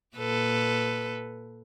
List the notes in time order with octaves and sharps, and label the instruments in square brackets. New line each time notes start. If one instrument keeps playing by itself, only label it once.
[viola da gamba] A#2 A4 B4